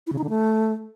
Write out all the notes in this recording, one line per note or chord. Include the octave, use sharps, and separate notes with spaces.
E4
C#3
D#4
D3
A3